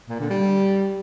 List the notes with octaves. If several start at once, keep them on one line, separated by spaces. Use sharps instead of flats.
A#2
D3
G3